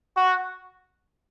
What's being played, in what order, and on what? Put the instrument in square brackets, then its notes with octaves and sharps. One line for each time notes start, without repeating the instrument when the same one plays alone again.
[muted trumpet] F#4